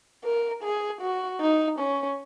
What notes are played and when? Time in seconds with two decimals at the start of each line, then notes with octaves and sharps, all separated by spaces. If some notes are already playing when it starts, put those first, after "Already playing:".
0.25 A#4
0.63 G#4
1.01 F#4
1.41 D#4
1.79 C#4